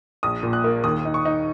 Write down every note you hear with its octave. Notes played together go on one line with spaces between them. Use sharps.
A#1 D#6
A#2
F#6
A#3
D#2 D#6
D#4
C#6
D#4